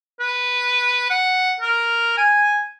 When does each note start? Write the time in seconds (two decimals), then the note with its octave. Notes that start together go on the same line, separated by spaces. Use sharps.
0.20 B4
1.10 F#5
1.60 A#4
2.17 G#5